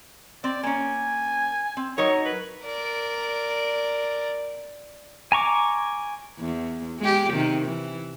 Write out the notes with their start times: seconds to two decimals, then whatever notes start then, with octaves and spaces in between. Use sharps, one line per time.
0.44 C4 D5
0.63 A#3 C#4 G#5
1.77 C4
1.98 F#3 D#4 A#4 C#5
2.25 B4
2.64 A#4 D5
5.32 G#5 A#5 C#6 D6
6.39 E2
6.99 G#3 G4
7.32 C3 D#3
7.65 E3